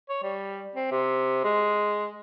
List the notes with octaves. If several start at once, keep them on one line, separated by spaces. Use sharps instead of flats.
C#5
G3
C4
C3
G#3